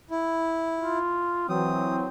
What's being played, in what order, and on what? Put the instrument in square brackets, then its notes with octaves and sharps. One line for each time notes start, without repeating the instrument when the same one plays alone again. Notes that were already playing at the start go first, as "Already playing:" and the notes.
[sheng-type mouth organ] E4
[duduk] F4
[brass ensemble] E3 F#3 [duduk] C4 [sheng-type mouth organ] D#6